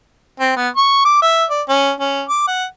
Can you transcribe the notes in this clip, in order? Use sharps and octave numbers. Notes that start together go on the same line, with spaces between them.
C4
B3
C#6
D6
E5
D5
C#4
C#4
D6
F#5